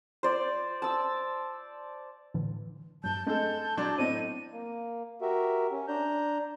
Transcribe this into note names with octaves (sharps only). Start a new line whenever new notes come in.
C5 D5
A5 E6
A2 D3 E3
G2 F#3 A5 G6
G#3 A3 C4 D4 A4 G6
F#3 D4 C6
A2 B3 C4 C5 D#5 D#7
A#3
F#4 G4 A#4 E5
C#4
D4 A#5 G6